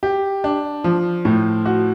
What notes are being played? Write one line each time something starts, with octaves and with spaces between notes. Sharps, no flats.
G4
D4
F3
A2
F#4